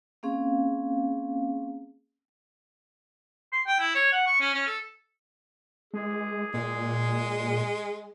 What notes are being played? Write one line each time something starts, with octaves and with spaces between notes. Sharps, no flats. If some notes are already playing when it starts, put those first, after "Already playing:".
A#3 C4 C#4 G#4 F5
C6
G5
E4
C#5
F#5
C#6
C#4
C#4
A4
G#3 G#4
A#2 G#3